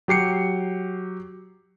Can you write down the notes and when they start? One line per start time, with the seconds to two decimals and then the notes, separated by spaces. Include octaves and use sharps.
0.08 F#3 G4 C7 C#7